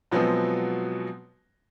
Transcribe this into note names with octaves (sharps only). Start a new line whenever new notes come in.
B2 F3 F#3 G#3 B3 C4